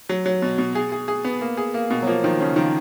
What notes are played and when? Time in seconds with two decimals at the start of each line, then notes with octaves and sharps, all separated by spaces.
0.09 F#3
0.26 F#3
0.42 B2
0.58 B2
0.75 G#4
0.92 G#4
1.08 G#4
1.25 B3
1.41 A#3
1.57 G#4
1.74 A#3
1.91 B2
2.02 F#3
2.07 F3 A#3
2.24 D#3 F3
2.40 C#3 F3
2.56 D#3 F3